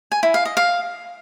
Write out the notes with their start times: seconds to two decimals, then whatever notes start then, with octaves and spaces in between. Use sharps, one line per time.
0.12 G#5
0.23 E4
0.34 F5
0.45 D#5
0.57 F5